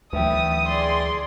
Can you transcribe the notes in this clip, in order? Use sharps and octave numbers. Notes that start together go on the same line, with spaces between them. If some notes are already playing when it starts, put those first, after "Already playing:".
D2 E3 F#3 A3 B4 E5 G5 D#6
G#4 D5 C6